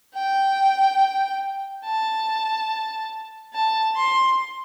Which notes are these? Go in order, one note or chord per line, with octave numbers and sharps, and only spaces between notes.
G5
A5
A5
C6